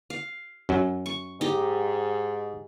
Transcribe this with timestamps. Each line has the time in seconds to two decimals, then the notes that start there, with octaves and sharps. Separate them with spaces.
0.10 F5
0.69 F#2 F#3
1.06 C#6
1.41 G#2 D#4 G4